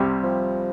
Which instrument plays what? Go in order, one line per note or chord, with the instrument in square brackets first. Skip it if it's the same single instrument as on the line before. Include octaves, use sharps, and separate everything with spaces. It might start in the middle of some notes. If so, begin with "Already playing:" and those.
Already playing: [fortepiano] C2 C3 G3
[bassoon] F3